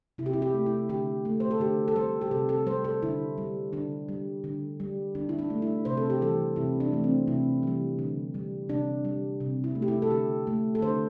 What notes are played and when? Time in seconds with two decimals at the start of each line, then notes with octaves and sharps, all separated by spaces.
0.18 C3 E4
0.26 G4
0.33 E4
0.42 G4
0.54 A3
0.66 E4
0.89 D3 G4
1.25 A3
1.40 C5
1.51 A4
1.60 D3 G4
1.88 A4
1.95 G3 C5
2.21 G4
2.31 C3 A4
2.49 A4
2.66 G3 C5
2.84 A4
3.02 D3 E4
3.38 G3
3.73 D3 D4
4.09 G3
4.44 D3
4.80 G3
5.15 D3 D4
5.29 E4
5.39 D4
5.50 A3
5.62 E4
5.85 C3 C5
5.97 A4
6.10 G4
6.21 E3 G3 A4
6.56 C3 E4
6.80 D4
6.92 E3 A3
7.04 C4
7.27 C3 E4
7.63 E3 G3
7.99 D3
8.34 G3
8.69 C3 D4
9.05 G3
9.40 C3
9.64 E4
9.75 A3
9.82 G4
9.88 E4
10.02 A4
10.11 D3 G4
10.47 A3
10.75 A4
10.82 D3 C5